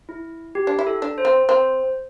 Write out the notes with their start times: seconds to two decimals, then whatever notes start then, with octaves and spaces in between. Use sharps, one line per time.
0.09 E4
0.55 G4
0.67 D4
0.79 E4
0.87 A4
1.02 D4
1.18 C5
1.25 C4
1.49 C4 C5